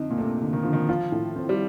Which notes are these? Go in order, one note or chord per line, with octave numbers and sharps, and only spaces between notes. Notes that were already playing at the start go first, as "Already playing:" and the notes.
Already playing: F2 D3 D#4
A#2
C3 A3
D3
D#3
D3 F3
D#3
F3 F4
A2
C4
G3